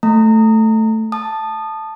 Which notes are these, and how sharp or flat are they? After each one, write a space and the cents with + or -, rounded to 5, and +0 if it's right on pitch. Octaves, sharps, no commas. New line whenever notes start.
A3 +0 A#5 -25 D#6 +0
A5 +0 D#6 -25